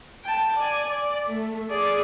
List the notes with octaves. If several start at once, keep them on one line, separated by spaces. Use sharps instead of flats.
G5 A5
D5 G#5
D5
A3
G#4 D5